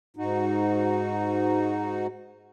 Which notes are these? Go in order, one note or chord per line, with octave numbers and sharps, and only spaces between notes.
G#2 D#4 F#4